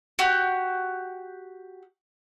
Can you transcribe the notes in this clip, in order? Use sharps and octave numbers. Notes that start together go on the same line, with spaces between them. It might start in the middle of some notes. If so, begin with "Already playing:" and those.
F#4 G4